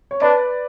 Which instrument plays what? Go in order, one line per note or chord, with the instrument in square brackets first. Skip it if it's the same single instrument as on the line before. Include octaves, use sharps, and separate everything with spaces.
[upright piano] C#5
[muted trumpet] D4 [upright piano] B4 D5